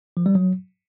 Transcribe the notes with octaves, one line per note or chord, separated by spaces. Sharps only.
F3
G3
F#3